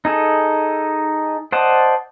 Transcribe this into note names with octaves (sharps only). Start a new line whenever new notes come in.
D#4 G#4 A4
C5 D5 D#5 F#5 A5